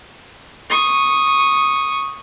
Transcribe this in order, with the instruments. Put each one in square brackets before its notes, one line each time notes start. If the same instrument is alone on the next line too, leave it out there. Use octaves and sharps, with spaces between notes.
[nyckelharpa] C#6 D#6